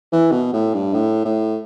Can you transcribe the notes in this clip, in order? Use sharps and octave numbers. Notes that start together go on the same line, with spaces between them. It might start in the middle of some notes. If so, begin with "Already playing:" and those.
E3
B2
A2
G2
A2
A2